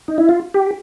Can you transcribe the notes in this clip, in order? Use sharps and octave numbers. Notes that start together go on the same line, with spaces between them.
D#4
E4
F4
G4